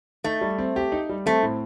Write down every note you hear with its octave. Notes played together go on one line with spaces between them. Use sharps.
A3 D#4
G3
C4
G4
D#4
G3
A3 C4
A2